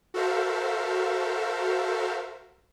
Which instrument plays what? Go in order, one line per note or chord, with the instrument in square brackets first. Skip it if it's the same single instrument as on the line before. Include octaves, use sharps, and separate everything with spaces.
[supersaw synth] F#4 A4 A#4 C5 E5 F5